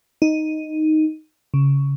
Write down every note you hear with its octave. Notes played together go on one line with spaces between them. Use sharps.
D#4
C#3